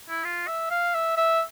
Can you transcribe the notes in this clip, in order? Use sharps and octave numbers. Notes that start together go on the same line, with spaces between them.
E4
F4
E5
F5
E5
E5